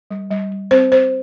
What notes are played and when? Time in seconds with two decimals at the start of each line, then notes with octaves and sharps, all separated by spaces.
0.11 G3
0.31 G3
0.52 G3
0.71 C4 C5
0.92 C4 C5